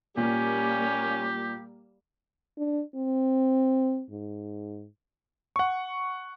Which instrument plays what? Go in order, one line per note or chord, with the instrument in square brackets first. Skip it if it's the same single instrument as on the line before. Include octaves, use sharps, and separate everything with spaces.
[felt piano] A#2 [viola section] G3 A#3 [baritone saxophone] C#4 [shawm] G4
[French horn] D4
C4
G#2
[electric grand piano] F#5 C#6